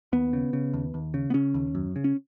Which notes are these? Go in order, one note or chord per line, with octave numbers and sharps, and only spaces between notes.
D#2 B3
C#3
C#3
D#2
D#2
C#3
B3
C#3 C#4
D#2
F#2
C#3
C#4